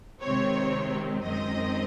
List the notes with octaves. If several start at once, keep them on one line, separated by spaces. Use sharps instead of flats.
C3 D#3 G#3 C4 C#5
F#2 D#3 G#3 C4 D#5